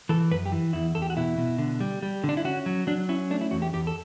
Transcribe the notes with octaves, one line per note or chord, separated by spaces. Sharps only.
E3 A4
F#2 B4
G4
E3
E2 E4
E2 A4
G4
F#4
B2 E4
B2
D3
G3
G3
D3
D4
E4
C#4 F#4
F#3
F#3 D4
C#4 E4
A3 D4
E4
E2 F#4
G4
E2 G4
A4